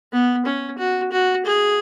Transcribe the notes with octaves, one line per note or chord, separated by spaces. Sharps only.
B3
C#4
F#4
F#4
G#4